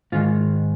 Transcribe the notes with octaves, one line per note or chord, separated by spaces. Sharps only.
G#2 D#3 G#3 F4